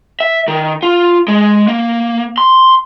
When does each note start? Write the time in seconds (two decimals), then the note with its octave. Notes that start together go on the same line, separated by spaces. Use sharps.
0.20 E5
0.48 D#3
0.83 F4
1.28 G#3
1.68 A#3
2.38 C6